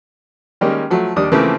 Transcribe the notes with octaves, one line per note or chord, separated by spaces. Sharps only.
D#3 G3 G#3 A#3 C#4
F3 F#3 A3
D#2 G3 D4 D#6
C#3 E3 F3 A3 A#3 C4